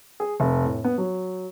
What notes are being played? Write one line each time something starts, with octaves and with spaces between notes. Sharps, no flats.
G#4
F1
A2
B3
F#3